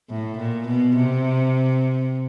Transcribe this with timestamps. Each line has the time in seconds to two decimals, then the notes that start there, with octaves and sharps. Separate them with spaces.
0.10 A2
0.38 A#2
0.67 B2
0.97 C3